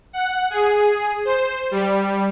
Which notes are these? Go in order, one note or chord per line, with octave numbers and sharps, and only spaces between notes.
F#5
G#4
C5
G3